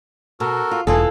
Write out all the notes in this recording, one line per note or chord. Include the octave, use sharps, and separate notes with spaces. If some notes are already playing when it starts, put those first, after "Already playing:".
B2 F#4 A4 A#4
F4
E1 E3 F4 G#4 A4